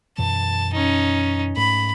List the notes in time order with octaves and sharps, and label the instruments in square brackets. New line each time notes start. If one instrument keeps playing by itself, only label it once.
[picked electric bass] F#2 B2 E3 [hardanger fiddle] A5
[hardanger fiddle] C#4 D#4
[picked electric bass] G#2 A3 [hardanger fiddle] B5